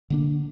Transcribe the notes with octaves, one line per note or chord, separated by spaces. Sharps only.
D3 A#3 D4